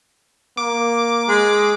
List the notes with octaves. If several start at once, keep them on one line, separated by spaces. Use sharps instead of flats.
A#3 D6
G#3